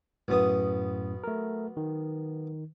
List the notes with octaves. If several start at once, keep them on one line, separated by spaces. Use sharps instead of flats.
B1 F#2 A2 B3 D#6
A3 A#4
D#3